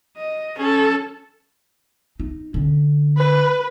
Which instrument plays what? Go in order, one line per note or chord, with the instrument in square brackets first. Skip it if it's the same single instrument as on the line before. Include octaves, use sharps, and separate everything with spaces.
[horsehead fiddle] D#5
C#4 A4
[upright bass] D#4
D3 C#4
[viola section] B4